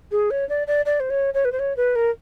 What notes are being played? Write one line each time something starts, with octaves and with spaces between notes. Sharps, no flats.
G#4
C#5
D5
D5
D5
C5
C#5
C#5
B4
C5
C#5
B4
A#4